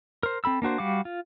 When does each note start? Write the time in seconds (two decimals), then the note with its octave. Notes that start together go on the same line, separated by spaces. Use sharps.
0.23 A#4 C5
0.44 C4 A4 B5 E6
0.62 A#3 D4 F#4 C5
0.78 G3 F#4 F5 D6
1.05 F4